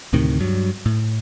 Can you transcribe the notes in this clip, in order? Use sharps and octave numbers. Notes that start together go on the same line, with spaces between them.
D2 A2 C3 D#3
G2 F#3
A2